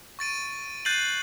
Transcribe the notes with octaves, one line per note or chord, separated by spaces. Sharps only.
C#6 A6 D7 D#7
F#6 G6 A6 C7 D#7 F#7